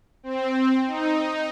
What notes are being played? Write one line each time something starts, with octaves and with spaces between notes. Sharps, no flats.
C4
D#4